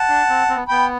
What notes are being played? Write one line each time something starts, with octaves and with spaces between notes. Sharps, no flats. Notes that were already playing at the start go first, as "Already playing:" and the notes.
Already playing: F#5 A5
D4
C4
C4
B3
B3 G5 B5